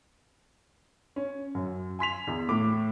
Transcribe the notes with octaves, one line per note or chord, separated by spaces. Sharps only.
C#4
F#2
G#5 C6 B6 F7
E2
A2 D6